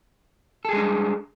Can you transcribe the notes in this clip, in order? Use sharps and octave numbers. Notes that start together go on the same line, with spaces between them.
G3 G#3 D4 G#4 A4